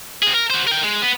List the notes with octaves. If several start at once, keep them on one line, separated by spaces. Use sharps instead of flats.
C4 G#4
A#4
F#4 C5
A#4 G5
G#3
B3